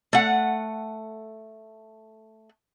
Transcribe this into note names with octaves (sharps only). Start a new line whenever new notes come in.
A3 F#5